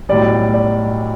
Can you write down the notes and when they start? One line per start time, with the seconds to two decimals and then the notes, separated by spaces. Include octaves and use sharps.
0.09 B1 A2 G3 D5
0.54 D5